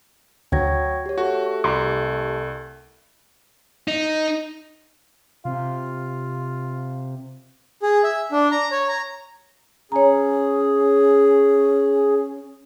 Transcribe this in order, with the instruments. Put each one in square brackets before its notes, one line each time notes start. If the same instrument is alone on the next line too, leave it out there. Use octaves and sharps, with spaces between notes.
[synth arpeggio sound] D2 [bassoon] F#3 [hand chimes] G5 G#6 A#6
[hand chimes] G4 C#5
[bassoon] A3 [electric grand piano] F#4 [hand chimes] G4
[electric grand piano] C2 [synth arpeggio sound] A#5 C6
[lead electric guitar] D#4
[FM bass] C3 [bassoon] F4
[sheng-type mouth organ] G#4
E5
D4
A#5
C#5
A#5
[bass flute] C#4 [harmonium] G#4 [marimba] C#5 A#5